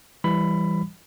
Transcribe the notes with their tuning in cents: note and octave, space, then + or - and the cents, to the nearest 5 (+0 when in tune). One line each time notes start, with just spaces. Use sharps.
E3 +15 G3 +0 B5 +15